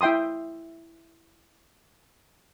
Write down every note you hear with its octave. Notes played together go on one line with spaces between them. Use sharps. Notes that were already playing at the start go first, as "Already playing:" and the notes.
E4 E5 G5 C6 D#6